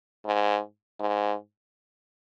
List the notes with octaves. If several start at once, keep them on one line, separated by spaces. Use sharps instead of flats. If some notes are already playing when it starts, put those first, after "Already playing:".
G#2
G#2